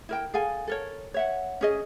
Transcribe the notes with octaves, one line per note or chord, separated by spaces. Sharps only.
E4 A#4 G5
G#4 A4 F5 G#5
A4 A#4 C#5
C#5 E5 F#5
C#4 G#4 D#5